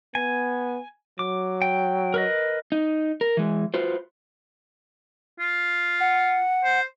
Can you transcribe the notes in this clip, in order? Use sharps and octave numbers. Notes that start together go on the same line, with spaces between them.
B3 G#5
F#3 D6
G5
A#4 B4 D#5
D#4
A#4
E3 G#3
F4 F#4 B4 C5
F4
F#5
C5